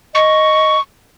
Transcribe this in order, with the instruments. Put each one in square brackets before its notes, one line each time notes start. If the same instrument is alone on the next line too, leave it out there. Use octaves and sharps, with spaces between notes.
[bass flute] D#5 [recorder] C#6